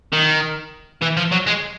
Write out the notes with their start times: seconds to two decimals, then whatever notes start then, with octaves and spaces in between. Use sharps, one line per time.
0.12 D#3
1.02 E3
1.17 F3
1.32 F#3
1.47 G#3